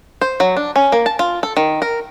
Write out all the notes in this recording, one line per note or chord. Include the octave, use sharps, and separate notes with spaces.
C5
F#3
D4
C#4
A#3
A5
F4
A4
D#3
A#4